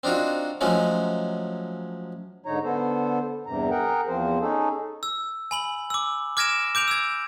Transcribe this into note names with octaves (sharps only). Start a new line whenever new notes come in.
C4 D4 D#4 F4 F#4
F3 F#3 G#3 A3 C#4 D#4
G#2 D3 D#4 C#5 A#5
D3 B3 A4 C5
E2 G2 C3 A#5
G#4 A#4 F#5 G5 A#5
E2 F3 C4 C5
C#4 D#4 G#4 A4
E6
G#5 B5 F#7
D6 E6
D6 F6 G#6 A#6 D7 E7
D6 G6 D7 F7
E6 G#6